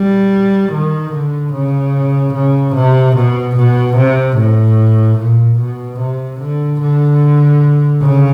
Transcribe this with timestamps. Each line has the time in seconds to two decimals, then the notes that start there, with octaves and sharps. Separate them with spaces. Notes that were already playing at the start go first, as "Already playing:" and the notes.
Already playing: G3
0.72 D#3
1.12 D3
1.53 C#3
2.34 C#3
2.75 C3
3.16 B2
3.56 B2
3.97 C3
4.37 A2
5.19 A#2
5.59 B2
6.00 C3
6.40 D3
6.81 D3
8.03 C#3